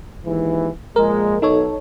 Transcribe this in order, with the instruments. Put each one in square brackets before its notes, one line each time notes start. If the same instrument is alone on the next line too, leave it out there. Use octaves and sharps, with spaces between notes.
[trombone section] D#2 G#2 E3
[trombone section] A#2 F3 G#3 [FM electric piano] A#4
[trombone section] B1 [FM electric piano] D#4 A4 C#5